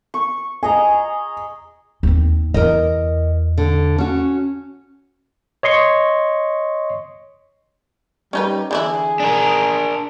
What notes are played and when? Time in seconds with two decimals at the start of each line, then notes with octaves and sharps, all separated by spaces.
0.14 C#6
0.63 G#4 D#5 G#5 A#5
2.03 D#2 C4
2.54 E2 A#4 D#5
3.58 D3
3.98 C#4 F#4
5.63 C#5 D#5 C6 C#6
8.33 G3 C#4 D#4 B4
8.71 D3 E3 E4 G#4
9.20 D4 A#4